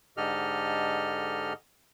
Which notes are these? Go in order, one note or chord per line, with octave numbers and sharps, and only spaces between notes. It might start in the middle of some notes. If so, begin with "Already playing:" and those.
G#2 D3 G4 A4 D#5 F6